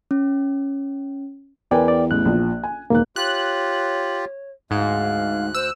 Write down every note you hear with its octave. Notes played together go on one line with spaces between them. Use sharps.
C#4
E2 A#4 B4 D5 G5 G#5
D5
A1 F#6
A#1 F3
G#5
E1 D#2 A#3 F#6
F4 G4 C#5 F#6
D2 G#2 F5 F#6
C5 E6